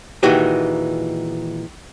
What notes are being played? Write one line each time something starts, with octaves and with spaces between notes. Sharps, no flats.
A#2 D#3 E3 G#3 F#4 G4